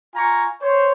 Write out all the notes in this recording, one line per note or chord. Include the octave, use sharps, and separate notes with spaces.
F4 G#5 A#5 C#6
C5 C#5